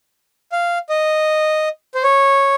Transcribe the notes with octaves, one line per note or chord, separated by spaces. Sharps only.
F5
D#5
C5
C#5